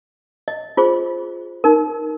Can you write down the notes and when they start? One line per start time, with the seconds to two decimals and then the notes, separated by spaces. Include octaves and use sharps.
0.48 D#5
0.77 F4 G#4 C5
1.64 D#4 A#4